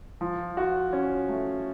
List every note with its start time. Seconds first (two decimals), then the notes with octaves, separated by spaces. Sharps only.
0.21 F3
0.57 F#4
0.93 C#4
1.28 A3